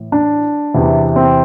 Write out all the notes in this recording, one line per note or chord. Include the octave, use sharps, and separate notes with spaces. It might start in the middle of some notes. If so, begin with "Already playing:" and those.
Already playing: A2 E3
D4
E2 C3 E3
C4